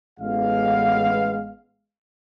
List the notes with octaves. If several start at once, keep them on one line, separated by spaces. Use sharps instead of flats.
A1 G#3 B3 F5